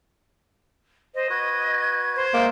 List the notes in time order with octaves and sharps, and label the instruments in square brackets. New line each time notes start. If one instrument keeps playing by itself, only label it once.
[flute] C5 [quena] D#5
[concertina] F#4 B4 [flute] G#6
[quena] C5
[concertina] G#3 D5 E5 [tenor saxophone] A#3